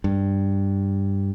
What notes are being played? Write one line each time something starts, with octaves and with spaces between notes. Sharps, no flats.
G2